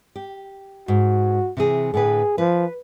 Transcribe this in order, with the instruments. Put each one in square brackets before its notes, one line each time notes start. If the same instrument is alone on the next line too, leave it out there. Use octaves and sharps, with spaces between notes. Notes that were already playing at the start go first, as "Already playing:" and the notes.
[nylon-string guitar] G4
[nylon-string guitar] G#2 [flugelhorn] F#4
[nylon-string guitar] C3 E3 G#4
[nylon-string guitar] A2 D3 B4 [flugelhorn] G#4
[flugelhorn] F3 [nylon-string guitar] B4